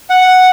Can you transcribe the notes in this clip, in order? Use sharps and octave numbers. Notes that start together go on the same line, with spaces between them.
F#5